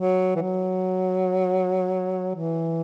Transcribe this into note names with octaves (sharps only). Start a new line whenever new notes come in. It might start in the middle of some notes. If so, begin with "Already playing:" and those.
Already playing: F#3
E3
F#3
E3